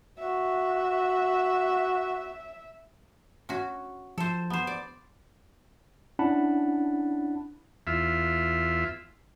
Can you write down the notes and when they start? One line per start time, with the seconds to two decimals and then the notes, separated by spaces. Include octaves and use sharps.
0.18 F#4 E5
3.49 C#4 F#4
4.18 F3 A4 C5
4.50 B3 C5
4.67 D5
6.19 C#4 D4 E4 F#5 A5 B5
7.87 E2 F4 E5